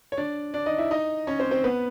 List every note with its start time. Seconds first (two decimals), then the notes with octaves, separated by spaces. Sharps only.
0.12 C#5
0.17 D4 D5
0.54 D4 D5
0.66 D#4 D#5
0.78 E4 E5
0.91 D#4 D#5
1.27 C#4 C#5
1.39 C4 C5
1.51 C4 C5
1.64 B3 B4